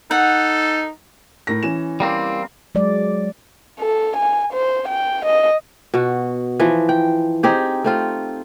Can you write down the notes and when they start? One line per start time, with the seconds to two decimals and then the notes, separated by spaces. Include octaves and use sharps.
0.11 D#4 A4 F#5
1.47 A2 A#4 A#6
1.63 E3 C#4 E7
2.00 G3 A#3 C4
2.75 F#3 G#3 D5
3.80 A4
4.17 G#5
4.53 C5
4.89 G5
5.25 D#5
5.94 B2 F#4
6.60 E3 F3
6.89 G5
7.43 C4 D#4 G4 G#4
7.84 A3 C4 F4